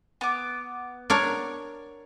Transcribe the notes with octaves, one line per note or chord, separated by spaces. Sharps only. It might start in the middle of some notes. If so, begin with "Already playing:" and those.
B3 D6
D4 A#4 C#5